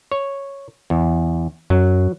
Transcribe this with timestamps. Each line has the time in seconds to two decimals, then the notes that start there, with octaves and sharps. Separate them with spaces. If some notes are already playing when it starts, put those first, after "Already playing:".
0.12 C#5
0.90 E2
1.70 F#2 F#3